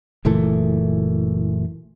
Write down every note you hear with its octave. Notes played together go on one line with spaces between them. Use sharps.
F#1 A#2 E3 A3